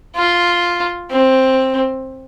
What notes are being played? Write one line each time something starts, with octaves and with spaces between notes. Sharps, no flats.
F4
C4